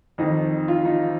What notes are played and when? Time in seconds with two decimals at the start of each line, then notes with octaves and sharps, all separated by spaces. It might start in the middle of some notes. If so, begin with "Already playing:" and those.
0.18 F2 D#3 D#4
0.68 F4
0.85 D#4